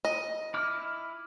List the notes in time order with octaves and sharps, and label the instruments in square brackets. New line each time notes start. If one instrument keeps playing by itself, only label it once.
[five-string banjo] D#5
[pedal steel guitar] E4 D6 F6